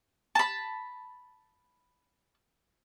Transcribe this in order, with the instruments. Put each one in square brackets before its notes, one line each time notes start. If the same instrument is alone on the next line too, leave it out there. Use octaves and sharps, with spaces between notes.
[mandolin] A5 B5